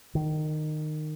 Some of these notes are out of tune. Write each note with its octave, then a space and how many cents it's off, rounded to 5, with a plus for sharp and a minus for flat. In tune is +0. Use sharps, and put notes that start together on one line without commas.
D#3 -20